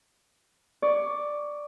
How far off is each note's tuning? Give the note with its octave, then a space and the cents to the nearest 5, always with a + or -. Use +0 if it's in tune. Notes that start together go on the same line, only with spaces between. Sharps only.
D5 +5 C#6 +20